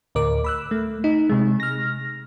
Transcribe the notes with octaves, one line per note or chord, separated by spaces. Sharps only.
D2 A2 A#4 D6
B5 E6 F#6
A3
D#4
C3 G#3
F6 A#6